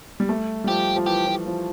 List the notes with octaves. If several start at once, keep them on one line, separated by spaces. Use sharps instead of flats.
G3
A3
G3
F3 G4
F3
E3 G4
F3
F3